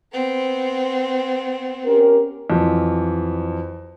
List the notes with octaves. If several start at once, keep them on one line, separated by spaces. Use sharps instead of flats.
B3 C4
C#4 G4 A#4
F2 E3 F#3